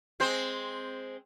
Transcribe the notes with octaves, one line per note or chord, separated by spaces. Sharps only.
G#3 C4 C5